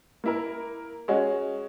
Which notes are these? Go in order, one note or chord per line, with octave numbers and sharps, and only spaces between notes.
A#3 E4 A#4
G#3 C#4 F#4